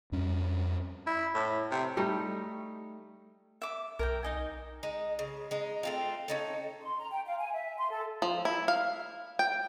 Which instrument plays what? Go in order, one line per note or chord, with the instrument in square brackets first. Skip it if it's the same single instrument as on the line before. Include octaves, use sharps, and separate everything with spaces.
[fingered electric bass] F2 G3 C#4
[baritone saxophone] E4
A2
C3
[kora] G3 A3 D#4
[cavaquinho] E5 D6
[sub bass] B1 [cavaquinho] A#4 C#5 G5
[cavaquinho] D#4 D#5 G#5
[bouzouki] G#3 D#4
C#3
G#3 D#4
A3 C4 F4
C#4 D#4 A4
[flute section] C6
A#5
G5
F5
G#5
E5
C6
A4
[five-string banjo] F3
E4
F5
G5